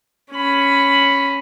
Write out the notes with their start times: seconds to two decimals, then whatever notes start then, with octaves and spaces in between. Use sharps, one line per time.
0.31 C#4 B5